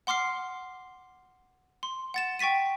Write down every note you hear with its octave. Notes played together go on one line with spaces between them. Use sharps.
F#5 C6 D6 F6 C7
C6
F#5 A6 E7
G5 C#6 A6 B6 D#7